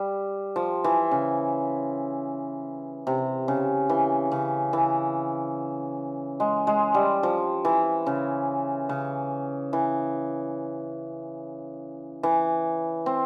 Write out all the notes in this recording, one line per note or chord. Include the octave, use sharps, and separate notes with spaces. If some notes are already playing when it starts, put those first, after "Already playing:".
Already playing: G3
F3
E3
C#3
C3
C#3
E3
C#3
E3
G#3
G#3
G3
F3
E3
C#3
C#3
E3
E3
C4